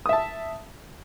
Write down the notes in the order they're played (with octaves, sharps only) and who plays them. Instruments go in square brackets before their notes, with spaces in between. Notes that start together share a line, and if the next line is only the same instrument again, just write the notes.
[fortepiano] D#6
E5
A5